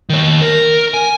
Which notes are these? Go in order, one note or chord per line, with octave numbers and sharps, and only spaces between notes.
D#3 C#5
A#4
G#5